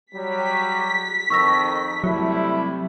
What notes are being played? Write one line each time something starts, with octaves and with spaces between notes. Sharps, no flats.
F#3 G3 B6
F2 D#3 C#6 E6 A#6
C3 F#3 G3 A3 E4